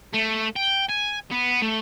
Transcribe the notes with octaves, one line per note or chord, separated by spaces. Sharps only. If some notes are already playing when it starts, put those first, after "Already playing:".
A3
G5
G#5
B3
A3